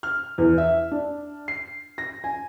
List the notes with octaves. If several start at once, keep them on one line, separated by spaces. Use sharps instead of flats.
F6
E2
E5
D4
C7
A#6
G#5